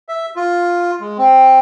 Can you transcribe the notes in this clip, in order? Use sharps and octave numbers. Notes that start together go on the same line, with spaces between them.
E5
F4
G#3
C4